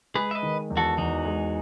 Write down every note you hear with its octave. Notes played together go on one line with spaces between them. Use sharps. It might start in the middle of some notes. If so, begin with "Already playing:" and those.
G#3 G#4 B4
E5
B4 D#5
D#3
E2
F#4 A4
E2 D#4 F#4
G#3